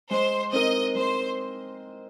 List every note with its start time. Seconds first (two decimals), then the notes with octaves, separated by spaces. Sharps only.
0.10 G#3 C5
0.53 C4 D#4 A#4 D#5
0.95 G#3 C5